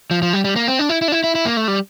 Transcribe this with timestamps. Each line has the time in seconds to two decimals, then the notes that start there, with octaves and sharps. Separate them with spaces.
0.11 F3
0.22 F3
0.33 G3
0.44 G3
0.56 A#3
0.68 C4
0.79 D4
0.89 E4
1.02 E4
1.08 D4
1.12 E4
1.24 E4
1.35 E4
1.45 A#3
1.57 A3
1.68 G3